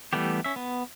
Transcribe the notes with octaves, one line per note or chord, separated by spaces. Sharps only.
E3 G3 A3 B3 G4
C#4 E5
B3